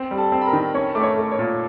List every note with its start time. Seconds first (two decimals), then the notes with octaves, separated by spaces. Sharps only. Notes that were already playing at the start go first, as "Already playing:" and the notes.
Already playing: C4
0.11 G3
0.17 A4 A5
0.32 C4
0.41 B5
0.46 A#4 A#5
0.53 D#3
0.74 C#4 C#5 C#6
0.95 A3 D6
1.03 C#5 C#6
1.18 A3
1.32 C#5 C#6
1.39 A#2